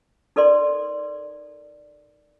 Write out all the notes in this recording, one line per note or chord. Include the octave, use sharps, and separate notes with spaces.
D#4 A4 A#4 D5 C6